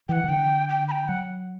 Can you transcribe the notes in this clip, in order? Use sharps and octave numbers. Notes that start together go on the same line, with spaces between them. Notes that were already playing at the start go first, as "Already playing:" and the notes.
E3 F#5 G5
E3
D3 G5
G5
B5
G5
F#3 F#5